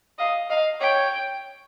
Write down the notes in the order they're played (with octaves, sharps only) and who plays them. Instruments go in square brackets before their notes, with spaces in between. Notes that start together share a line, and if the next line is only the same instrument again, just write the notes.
[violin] D#5 [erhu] F5
[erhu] D#5 [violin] F5
[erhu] C#5 [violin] G5